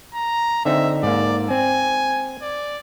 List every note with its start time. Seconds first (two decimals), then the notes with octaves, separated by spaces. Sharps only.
0.14 A#5
0.65 D3 C4 D#4 E5
1.03 G#2 A#3 D5
1.50 C4 G#5
2.42 D5